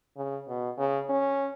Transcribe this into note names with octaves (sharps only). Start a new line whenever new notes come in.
C#3
B2
C#3
C#4